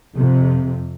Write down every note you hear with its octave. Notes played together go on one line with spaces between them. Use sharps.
F2 C3